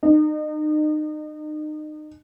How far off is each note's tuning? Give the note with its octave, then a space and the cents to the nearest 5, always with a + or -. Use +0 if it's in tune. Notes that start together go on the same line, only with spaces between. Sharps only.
D#4 -35